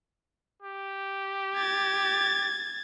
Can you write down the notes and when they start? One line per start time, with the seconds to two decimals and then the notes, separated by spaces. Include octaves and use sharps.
0.62 G4
1.56 G#6 A6